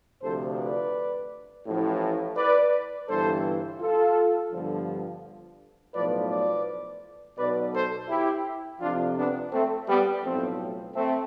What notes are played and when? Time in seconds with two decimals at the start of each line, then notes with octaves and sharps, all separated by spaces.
0.22 D2 C3 F3 A4 C5
0.59 B4 D5
1.65 A1 A2 F3
2.37 B4 D5
3.08 G1 G2 E3 A4 C5
3.80 F4 A4
4.52 G1 G2 D3 F3
5.95 B1 A2 F3 B4 D5
6.30 B4 D5
7.38 B1 B2 B4 D5
7.73 A4 C5
8.09 E4 G4
8.80 F2 C3 F3 D4 F4
9.17 B3 D4
9.52 A3 C4
9.88 G3 B3
10.24 B1 A2 F3 A3 C4
10.95 A3 C4